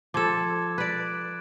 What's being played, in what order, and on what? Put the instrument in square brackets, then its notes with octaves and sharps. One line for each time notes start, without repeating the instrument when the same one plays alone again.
[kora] F3 A4 [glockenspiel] D6 G#6 E7
[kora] B4 D5 [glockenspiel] F#6 D7